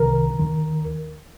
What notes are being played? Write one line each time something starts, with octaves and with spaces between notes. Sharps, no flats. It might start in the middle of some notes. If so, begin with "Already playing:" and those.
Already playing: C2 C3 D#3 A#4
D#2 D#3